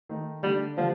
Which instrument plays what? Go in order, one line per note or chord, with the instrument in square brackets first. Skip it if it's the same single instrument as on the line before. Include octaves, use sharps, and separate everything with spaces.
[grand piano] D#3 A3 D#4
[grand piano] D3 A3 D4 [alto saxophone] G3
[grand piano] D3 G3 D4 [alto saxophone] F3